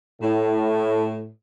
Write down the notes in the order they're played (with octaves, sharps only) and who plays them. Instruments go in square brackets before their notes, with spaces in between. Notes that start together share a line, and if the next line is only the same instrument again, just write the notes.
[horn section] A2